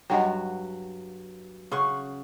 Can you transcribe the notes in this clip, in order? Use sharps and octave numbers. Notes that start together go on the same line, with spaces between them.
G2 F#3 D#5 F#5 G5
C#3 C#4 F#5 C6 C#6